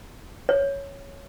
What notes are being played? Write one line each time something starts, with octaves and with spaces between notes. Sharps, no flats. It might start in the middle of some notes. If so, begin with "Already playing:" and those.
C#5